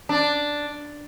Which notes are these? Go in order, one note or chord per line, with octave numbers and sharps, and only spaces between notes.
D4